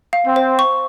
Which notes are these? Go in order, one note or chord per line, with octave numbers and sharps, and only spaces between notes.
F5
C4
C5
C#6